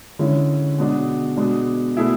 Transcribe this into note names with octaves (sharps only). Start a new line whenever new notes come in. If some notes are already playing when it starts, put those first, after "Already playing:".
D3 G#3 C#4 E4
B2 G#3 D4 F#4
B2 G#3 D4
B2 A3 E4 G#4